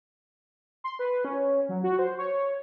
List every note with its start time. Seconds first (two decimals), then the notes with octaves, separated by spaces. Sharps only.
0.84 C6
0.99 B4
1.25 C#4
1.69 F#3
1.84 F#4
1.99 C5
2.18 C#5